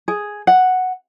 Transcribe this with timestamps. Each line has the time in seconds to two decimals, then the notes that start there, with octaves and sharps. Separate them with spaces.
0.08 G#4
0.47 F#5